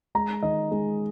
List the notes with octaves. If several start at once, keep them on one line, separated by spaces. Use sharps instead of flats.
G#3 A#5
D#3 D#5
G#3